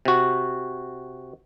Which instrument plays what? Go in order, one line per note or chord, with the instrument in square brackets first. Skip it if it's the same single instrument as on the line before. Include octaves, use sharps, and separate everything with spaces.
[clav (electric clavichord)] C3 F#4